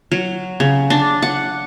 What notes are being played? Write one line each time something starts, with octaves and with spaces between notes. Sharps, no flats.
F#3
C#3
D4
F#5